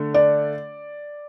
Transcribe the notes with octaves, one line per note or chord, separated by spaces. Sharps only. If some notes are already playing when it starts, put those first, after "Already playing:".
Already playing: D3 A3
D5